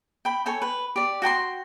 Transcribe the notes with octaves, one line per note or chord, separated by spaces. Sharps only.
G5 B5
A4 C#5 G5 G#5
B4
G4 D5
F#4 G5 A5 C6